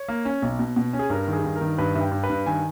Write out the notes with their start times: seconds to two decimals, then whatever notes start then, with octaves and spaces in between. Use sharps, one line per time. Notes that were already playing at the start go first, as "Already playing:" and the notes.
Already playing: C#5
0.08 A#3
0.25 C#4
0.42 B1
0.59 B2
0.76 B2
0.93 C#4
0.99 G#4
1.10 G2 A#4
1.28 D#3
1.33 G#4
1.44 G2
1.56 A#4
1.61 D#3
1.78 G2 B4
1.95 G2 E5
2.01 G5
2.12 G2
2.24 B4
2.29 G2
2.46 D#3 G#5